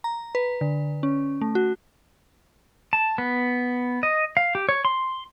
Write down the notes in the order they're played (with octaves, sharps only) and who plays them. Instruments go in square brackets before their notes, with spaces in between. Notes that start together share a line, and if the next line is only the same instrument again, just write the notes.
[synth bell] A#5
B4
D3
C#4
A3
F#4
[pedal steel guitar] A5
B3
D#5
F5
G4
C#5
C6